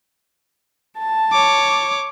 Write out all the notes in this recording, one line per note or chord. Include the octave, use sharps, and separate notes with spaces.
A5
C#5 D6